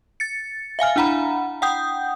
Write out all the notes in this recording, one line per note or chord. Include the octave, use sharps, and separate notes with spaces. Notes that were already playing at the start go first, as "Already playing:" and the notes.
A6 C#7
E5 F5 G#5 F6
D4 E4 F#5 A#5 B5
F#5 G5 D#6 G6